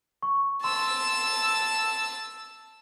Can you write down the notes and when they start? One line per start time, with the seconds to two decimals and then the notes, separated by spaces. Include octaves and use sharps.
0.23 C#6
0.64 A5 C6 E6